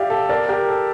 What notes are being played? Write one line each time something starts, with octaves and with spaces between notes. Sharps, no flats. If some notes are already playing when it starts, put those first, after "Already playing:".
Already playing: G4 D5 E5 F5
A4
A#4 D5
G4 A#4
A4